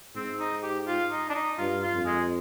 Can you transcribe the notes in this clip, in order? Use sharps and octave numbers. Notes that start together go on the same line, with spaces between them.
G#2 C4
D#4
G4
F4
D#4
D4
D#4
G2 F4
F4
F2
G#3